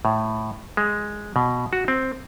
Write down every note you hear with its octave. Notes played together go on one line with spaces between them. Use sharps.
A2
G#3
B2
F#4
C4